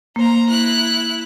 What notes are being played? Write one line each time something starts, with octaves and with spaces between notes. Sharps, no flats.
A#3 C5 A#5
E4 F#6